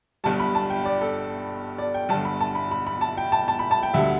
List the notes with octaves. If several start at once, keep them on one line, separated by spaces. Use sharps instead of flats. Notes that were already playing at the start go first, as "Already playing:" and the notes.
G1 G2 G3 A5
B5
A5
G5
D5
A4
D5
G5
G1 G2 D3 A5
B5
A5
B5
B5
B5
A5
G5
A5
A5
B5
A5
G5
D2 D3 G3 E5